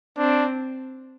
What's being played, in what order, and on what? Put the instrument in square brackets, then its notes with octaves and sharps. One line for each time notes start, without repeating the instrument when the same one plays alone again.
[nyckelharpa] C4 [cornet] D4